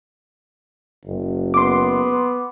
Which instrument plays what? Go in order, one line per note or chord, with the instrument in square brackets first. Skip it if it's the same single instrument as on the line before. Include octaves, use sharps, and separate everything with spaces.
[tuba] F#1
[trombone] B3 [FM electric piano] C6 D6